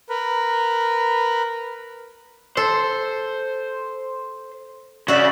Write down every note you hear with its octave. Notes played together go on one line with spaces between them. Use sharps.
A#4 B4
A4 C5
C#3 F#4 D5 E5